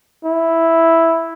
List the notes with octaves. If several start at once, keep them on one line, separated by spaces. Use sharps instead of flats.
E4